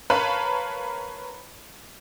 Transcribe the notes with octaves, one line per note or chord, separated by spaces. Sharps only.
A#4 B4 C#5 F5 A5 B5